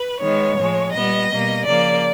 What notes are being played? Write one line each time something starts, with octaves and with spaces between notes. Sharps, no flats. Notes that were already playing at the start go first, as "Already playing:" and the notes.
Already playing: B4
D#3 G#3 B3 C#5
A2 F3 G#3
A#2 G3 B3 D#5
B2 G3 A#3
C#3 F3 A#3 D5